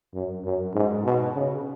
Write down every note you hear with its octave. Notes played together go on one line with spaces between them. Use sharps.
F#2
F#2
G#2
B2
C#3